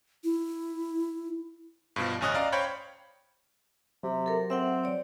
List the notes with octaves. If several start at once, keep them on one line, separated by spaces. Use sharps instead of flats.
E4
G2 B2 F3
A1 D2 C#4 D#5 D#6 F#6
D5 D#5 F5 A#5
C5 C#5 F5 G5 B5
C3 F#3
A4 A#4
C4 E5 F#5 G5
C#5 D5